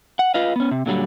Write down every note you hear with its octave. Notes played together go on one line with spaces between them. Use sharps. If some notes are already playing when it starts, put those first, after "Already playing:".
F#5
F4 B4 D#5 F5
B3 C#4
C3
A#2 D3 F#3 G3